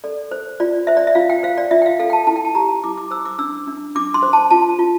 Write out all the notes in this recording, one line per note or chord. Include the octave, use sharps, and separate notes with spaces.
A4 D5
C5
F4 D5
C5 E5
D5
E5
F4 F5
G5
C5 F5
D5
F4 E5
G5
F5
A4 F5
G5
A5
E4 A5
G5
A5
G4 A#5
E4 D6
D6
C5 E6
D6
D4 E6
D4
D4 D6
C6
C5
A5
F4 A5
F4